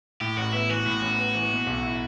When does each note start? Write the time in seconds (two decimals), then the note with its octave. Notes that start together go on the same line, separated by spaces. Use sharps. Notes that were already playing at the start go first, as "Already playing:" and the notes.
0.20 A2 G4
0.37 A1 F#4
0.52 B3 E4
0.69 E3 F#4
0.85 A2
1.02 A1
1.17 B3
1.34 E3
1.51 B2
1.67 B1
1.83 E4